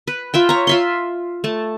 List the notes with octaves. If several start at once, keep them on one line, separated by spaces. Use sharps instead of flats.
B4
F4 E5 G5
C#5 A#5
F4 E5 C6
A3 A5